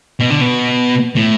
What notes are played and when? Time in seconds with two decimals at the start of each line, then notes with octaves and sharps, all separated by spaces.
0.20 B2
0.30 D3
0.41 B2
1.16 A2